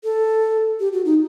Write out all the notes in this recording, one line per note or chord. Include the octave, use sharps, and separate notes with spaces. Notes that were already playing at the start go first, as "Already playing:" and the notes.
A4
G4
F#4
D#4